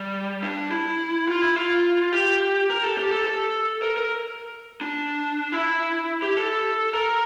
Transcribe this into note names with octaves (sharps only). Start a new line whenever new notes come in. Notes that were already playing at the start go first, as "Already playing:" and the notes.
Already playing: G3
D4
E4
F4
E4
F4
G4
A#4
A4
G4
A4
A4
A#4
A#4
D4
E4
G4
A4
A#4